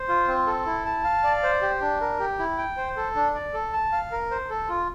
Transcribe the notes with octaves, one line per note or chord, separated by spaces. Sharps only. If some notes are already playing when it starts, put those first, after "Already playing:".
Already playing: C5
F4
C4
A4
E4
A5
F5
D5
C5
G4
D4
A#4
G4
E4
G5
C5
A4
D4
D5
A4
A5
F5
A#4
C5
A4
F4